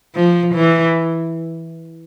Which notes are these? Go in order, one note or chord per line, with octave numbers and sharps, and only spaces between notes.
F3
E3